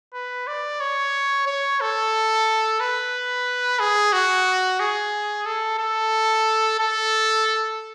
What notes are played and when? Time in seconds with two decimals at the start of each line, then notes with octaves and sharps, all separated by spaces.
0.14 B4
0.47 D5
0.80 C#5
1.47 C#5
1.81 A4
2.80 B4
3.80 G#4
4.13 F#4
4.80 G#4
5.46 A4
5.79 A4
6.79 A4